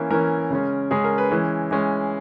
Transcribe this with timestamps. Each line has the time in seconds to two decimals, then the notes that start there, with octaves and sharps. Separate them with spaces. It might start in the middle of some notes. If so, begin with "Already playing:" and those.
Already playing: E3 A#3 C#4
0.10 E3 A#3 C#4 A#4
0.50 C#3 G#3 C#4
0.91 C#3 G#3 C#4 G#4
1.04 A#4
1.18 B4
1.31 E3 G#3 C#4
1.71 E3 G#3 C#4